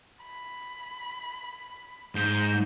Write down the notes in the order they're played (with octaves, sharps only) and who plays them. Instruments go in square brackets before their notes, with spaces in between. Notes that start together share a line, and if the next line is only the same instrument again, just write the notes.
[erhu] B5
[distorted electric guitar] G#2 [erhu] G6